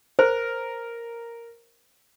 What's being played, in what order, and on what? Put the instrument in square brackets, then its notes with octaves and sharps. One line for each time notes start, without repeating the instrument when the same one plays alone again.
[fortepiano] A#4 [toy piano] C5